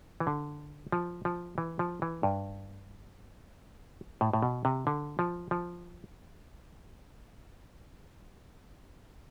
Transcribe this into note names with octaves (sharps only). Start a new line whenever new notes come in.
E3
D3
F3
F3
E3
F3
E3
G2
A2
A2
B2
C3
D3
F3
F3